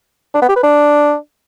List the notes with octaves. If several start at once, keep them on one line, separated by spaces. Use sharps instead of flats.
D4
B3
G4
B4
D4